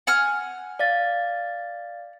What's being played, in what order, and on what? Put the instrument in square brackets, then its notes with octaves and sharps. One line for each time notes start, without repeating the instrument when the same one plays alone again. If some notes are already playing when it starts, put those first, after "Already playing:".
[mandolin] F#5 G#5 F6
[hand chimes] D5 F5 A6